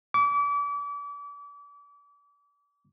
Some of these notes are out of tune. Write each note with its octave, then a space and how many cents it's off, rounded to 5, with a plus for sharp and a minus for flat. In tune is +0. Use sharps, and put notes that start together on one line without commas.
D6 -35